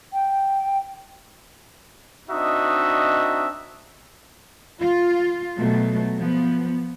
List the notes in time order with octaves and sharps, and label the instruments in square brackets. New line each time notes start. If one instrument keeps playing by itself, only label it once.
[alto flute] G5
[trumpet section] C4 D4 D#4 F#4 D#5 E5
[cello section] F4
B2 F#3 A3
F3 B3